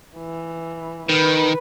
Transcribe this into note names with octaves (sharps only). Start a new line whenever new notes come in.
E3
D#3 B4